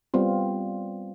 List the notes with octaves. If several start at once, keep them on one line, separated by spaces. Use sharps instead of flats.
G3 B3 C4 F4